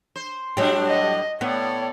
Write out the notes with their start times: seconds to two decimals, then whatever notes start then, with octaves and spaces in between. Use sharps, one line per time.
0.16 C5
0.57 A2 F#3 G3 D4 G4
0.87 D#5
1.41 A2 B3 C#5 D5